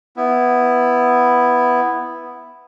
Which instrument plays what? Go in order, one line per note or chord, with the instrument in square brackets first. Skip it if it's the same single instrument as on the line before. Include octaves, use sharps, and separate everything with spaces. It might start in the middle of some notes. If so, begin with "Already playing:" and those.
[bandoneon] B3 E4